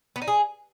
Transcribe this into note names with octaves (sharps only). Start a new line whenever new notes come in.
B3
D#4
G#4